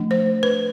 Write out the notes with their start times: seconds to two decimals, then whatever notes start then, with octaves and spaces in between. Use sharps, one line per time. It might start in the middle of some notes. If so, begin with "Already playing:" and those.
Already playing: F3 A3 D4
0.11 C5
0.43 B4